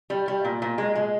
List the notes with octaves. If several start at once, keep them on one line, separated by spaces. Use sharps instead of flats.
G3
G3
A#2
A#2
G#3
G#3